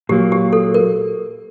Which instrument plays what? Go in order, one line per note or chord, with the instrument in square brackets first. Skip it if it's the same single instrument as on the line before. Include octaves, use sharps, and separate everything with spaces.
[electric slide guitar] A#2 F#3 A#3 [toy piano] G4
[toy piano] G4
A4
A#4